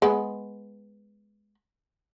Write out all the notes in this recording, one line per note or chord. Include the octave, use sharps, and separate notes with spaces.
G#3 B3